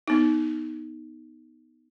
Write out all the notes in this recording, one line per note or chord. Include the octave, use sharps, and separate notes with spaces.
B3 D#4